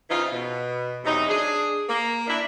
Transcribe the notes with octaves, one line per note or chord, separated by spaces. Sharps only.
C#3 E3 C4 D#4 F4
B2
E2 C3 F#3 D#4
D4 G#4
A#3
D4 E4